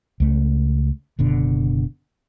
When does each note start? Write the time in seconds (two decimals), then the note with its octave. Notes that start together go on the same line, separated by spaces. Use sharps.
0.20 C#2 A3
1.19 F#1 B2 D3